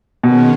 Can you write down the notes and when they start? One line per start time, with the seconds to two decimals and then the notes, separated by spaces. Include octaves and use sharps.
0.23 B2 D#3 G#3 C#4